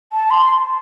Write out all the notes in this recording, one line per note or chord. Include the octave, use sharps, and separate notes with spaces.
A5
C6